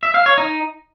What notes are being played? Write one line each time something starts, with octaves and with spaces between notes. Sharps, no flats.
E5
F5
C#5
D#4